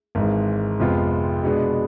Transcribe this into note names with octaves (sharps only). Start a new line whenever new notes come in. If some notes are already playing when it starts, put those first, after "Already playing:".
G#1 G#2 E3 G#3
F2 C3 G#3 B3 F4
B2 G#3 B3 D4